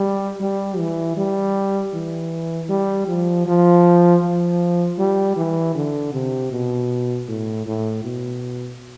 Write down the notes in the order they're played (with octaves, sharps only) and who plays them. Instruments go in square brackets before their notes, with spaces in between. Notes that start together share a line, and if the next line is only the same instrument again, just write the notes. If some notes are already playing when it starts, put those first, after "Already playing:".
Already playing: [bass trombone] G3
G3
E3
G3
E3
G3
F3
F3
F3
G3
E3
D3
C3
B2
A2
A2
B2